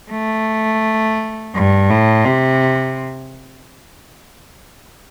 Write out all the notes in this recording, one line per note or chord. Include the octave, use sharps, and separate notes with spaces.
A3
G2
A2
C3